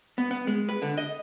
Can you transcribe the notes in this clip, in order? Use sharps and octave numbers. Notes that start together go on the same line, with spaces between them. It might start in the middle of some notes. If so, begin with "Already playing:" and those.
B3
B3
G#3
B4
D3
D#5